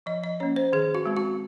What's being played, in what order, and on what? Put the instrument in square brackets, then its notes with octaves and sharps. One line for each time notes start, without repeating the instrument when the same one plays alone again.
[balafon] F3 D#5
D#5
A#3 C#4 C#5
C5
D#3 G#4
F#4
G#3 C4
F#4